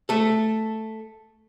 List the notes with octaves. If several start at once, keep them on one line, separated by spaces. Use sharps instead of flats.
A3 A4